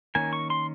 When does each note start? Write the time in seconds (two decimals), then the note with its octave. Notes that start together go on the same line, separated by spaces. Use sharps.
0.15 D#3 A#3 C#4 G#5
0.33 C#6
0.50 C6